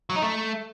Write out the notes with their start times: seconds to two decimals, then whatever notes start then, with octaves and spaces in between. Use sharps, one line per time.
0.10 F#3
0.16 D#4
0.22 A3